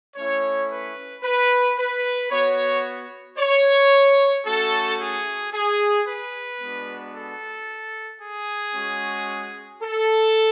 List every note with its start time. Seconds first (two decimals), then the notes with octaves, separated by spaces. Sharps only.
0.16 A3 C#4 E4 C#5
0.70 B4
1.24 B4
1.78 B4
2.31 B3 F#4 C#5
3.38 C#5
4.46 A3 C#4 F#4 A4
5.00 G#4
5.53 G#4
6.06 B4
6.60 G#3 B3 D4 F#4
7.14 A4
8.22 G#4
8.75 G#3 C#4 F#4
9.83 A4